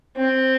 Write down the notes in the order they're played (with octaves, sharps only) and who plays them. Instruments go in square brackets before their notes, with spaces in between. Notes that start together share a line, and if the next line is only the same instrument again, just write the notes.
[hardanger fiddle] C4